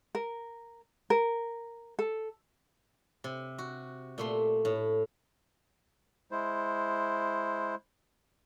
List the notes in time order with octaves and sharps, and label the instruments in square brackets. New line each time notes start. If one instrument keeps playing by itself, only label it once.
[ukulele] A#4
A#4
A4
[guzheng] C3
F#4
A#2 A3 C6
A2
[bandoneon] G#3 E4 C5